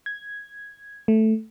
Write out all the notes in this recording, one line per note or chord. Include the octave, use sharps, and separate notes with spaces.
G#6
A3